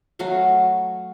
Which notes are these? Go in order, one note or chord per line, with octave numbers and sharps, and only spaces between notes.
F#3 A3 F#4 F5